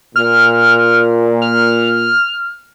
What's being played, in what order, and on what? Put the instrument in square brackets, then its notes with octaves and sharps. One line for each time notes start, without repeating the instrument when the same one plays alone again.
[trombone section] A#2 [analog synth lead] F6
[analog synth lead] F6